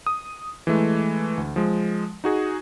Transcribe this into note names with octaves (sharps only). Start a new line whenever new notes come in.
D#6
E3 G#3 A3
D2
F3 G#3
D#4 F#4 G#4